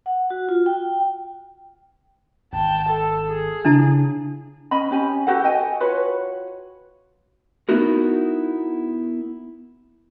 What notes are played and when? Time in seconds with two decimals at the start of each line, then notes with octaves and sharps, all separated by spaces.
0.06 F#5
0.30 F#4
0.49 F4
0.66 G5
2.53 G#1 G5 A5
2.89 A4
3.30 G#4
3.65 C#3 D4 E4 A5
4.71 C#4 D#5 B5
4.91 C#4 G4 G#5
5.27 F#4 G4 A4 F#5
5.44 D#5 G5 G#5
5.80 F4 F#4 B4 C#5
7.69 B3 D#4 E4 F#4 A#4